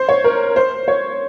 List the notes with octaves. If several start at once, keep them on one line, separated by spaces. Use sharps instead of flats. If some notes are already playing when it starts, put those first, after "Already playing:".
Already playing: C5
C#5
A#4
C5
C#5